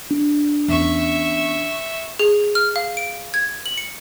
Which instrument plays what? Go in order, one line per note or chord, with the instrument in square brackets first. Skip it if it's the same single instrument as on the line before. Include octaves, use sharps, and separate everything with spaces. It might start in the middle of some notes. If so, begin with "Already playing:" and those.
[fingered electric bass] D4
[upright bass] E2 C#4 [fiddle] E5 C#6
[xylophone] G#4
F6
F5
D7
G#6
F#7
C#7